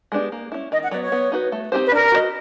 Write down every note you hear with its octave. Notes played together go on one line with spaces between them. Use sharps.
G#3 B3 D4 G4
A#3
C#4 E4
D#3 D#5
F#5
F#3 B3 D5
C#5
B3
D#4 F#4 B4
A3
C4 D#4 G4 C5
B4
D4 A#4
F#4 B4 D#5